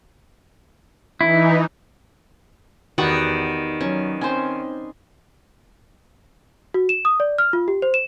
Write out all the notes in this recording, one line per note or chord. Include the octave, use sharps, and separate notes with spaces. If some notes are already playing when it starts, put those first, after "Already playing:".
E3 D#4 E4
E2 D#3 B3 F#4 G4 D5 F#5
F#3 C#4
C4 C#4 C5 G#5 C6
F#4
E7
D#6
D5
F6
F4
G4
C5
E7